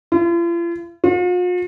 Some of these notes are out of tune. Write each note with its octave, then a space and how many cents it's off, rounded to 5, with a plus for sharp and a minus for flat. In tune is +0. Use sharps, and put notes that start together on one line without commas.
F4 -45
F4 +45